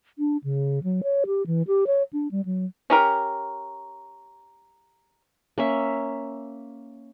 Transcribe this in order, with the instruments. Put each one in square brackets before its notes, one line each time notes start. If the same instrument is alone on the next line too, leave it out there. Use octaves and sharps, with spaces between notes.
[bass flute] D4
C#3
F#3
C#5
G4
E3
G4
C#5
D4
G3
F#3
[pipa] C#4 G4 A#4
[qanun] A#3 C#4 E5